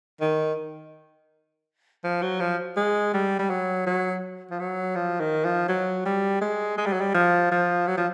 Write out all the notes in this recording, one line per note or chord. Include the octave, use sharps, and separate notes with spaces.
D#3
F3
F#3
F3
G#3
G3
G3
F#3
F#3
F3
F#3
F3
D#3
F3
F#3
G3
G#3
G#3
G3
F#3
G3
F3
F3
F#3
F3